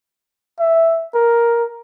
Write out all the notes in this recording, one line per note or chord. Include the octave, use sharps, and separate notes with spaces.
E5
A#4